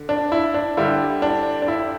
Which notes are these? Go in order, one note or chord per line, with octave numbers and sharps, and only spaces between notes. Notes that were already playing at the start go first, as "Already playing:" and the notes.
Already playing: D3
D4
E4
D4
D3 G3 E4
D4
D4
E4